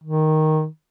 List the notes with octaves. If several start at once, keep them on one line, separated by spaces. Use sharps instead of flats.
D#3